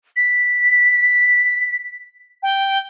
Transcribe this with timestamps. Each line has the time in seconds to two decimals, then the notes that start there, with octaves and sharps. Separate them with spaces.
0.16 B6
2.42 G5